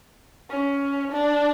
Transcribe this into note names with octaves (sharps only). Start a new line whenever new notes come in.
C#4
D4